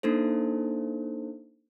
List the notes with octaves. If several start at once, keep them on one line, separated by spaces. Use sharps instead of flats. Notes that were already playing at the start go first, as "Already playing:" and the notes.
A#3 D4 D#4 A4 C5